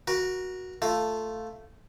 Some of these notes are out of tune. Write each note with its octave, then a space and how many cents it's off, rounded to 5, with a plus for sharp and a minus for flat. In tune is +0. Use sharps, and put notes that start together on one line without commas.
F#4 -5 A#4 +30
A3 +5 F4 +0